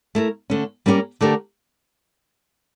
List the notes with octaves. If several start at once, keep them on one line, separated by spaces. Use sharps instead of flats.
A3 E4 A#4
D3 A3 C#4
G3 A#3 C#4 G4 A#4
D3 A3 D4 G4 A#4